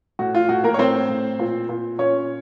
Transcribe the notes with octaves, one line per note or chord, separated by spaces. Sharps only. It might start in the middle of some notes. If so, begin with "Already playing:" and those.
A2 F#4
F4
A2 F#4
A#3 A#4
C#5
A2 C4 C5
A2
A#2
A#2
A#2 C#4 C#5